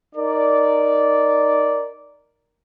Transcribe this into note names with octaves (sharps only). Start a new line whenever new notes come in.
D#4 A#4 D5